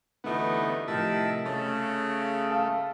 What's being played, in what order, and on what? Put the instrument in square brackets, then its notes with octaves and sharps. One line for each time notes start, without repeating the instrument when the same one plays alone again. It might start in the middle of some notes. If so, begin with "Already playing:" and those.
[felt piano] D2 E3 [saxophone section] G2 A3 D#4 [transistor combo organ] B3
[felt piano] A2 C3 F3 [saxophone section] D#3 [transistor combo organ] E5 A5
[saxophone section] C#3 [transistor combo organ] A3 [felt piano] A6
[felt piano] F5 A5 D#6